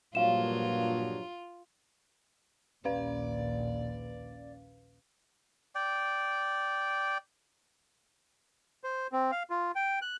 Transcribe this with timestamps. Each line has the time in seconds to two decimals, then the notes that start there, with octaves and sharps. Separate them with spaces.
0.15 G2 A#2 F3 F#3 F4 F5 E7
2.85 A#1 D#2 C#4 B4 D5 F5
5.75 D5 G5
8.84 C5
9.12 C4
9.32 F5
9.50 F4
9.75 G5
10.02 F#6